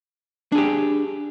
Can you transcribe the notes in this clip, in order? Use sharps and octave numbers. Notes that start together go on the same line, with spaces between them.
D4 G4 G#4